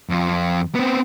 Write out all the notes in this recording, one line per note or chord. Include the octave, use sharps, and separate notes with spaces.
F2 F4
B3 C4